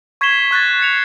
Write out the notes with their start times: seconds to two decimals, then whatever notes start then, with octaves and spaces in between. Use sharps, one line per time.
0.21 C#6 G#6 B6 C7 E7 G7
0.51 C#6 F#6 G#6 A6
0.80 F#6 C7 C#7 F7